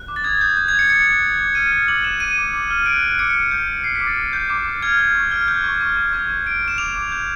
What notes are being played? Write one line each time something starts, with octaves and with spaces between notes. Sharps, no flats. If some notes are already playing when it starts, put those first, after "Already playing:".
Already playing: F#6
D6
A6
D#6 G#6
D#6 G6
G6
G#6
G6
C#7
F#6 C#7
F#6
F#6
D6
F6 D#7
F6
D6 F#7
F6 E7
D6 D#7
D6
D6
F6
F#6 D7
F#6
D6 C#7
F#6
G6
G6
G6 C7
B6
D6
A6
D6
F#6 G6
D6
D6
F6 G#6
F6
C#6
F6
F#6 G6
C#6
C#6
C#6
C#6 G#6
C#6
C#6 D7
C#6
E7
D6 F7
D6
G6